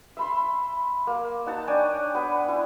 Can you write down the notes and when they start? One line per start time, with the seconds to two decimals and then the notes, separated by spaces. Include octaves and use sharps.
0.17 E5 B5 C6
1.07 A#3
1.46 D#4 F#5 A5 A#5
1.67 D4 C#5 G5 G#5
2.14 B3 B4
2.48 E4 G#5